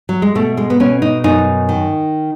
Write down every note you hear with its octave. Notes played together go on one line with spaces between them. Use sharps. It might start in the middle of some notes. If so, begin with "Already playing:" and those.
F#3
G#3
B2 A3
G#3
B3
B2 C#4
D#4
F#2 D#4
D#3